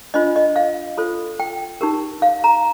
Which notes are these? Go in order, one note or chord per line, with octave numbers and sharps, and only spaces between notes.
D4 F4 C5 D#5
D#5
F5
F4 A4 C5
G5
D#4 G4 A#4
F5
A#5